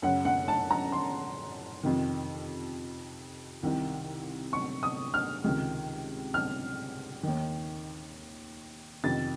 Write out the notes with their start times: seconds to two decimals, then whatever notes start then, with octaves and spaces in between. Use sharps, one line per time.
0.02 F#2 C#3 F#5
0.25 F#5
0.48 A5
0.71 A#5
0.92 C6
1.83 F2 C3 D#3
3.63 C2 C3 D#3
4.53 C#6
4.83 D#6
5.14 F6
5.44 C#2 C3 D#3
6.34 F6
7.23 D#2 D#3
9.04 F2 C3 D#3 A6